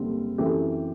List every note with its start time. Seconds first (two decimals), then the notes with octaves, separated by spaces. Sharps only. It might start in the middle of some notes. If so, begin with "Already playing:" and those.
Already playing: F#1 D3 G3 C4
0.38 F#2 E3 A3 C4 G4